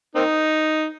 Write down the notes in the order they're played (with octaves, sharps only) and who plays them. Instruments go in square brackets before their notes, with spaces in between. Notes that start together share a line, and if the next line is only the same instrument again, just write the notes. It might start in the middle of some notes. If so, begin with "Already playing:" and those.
[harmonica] A#3 C4 D#4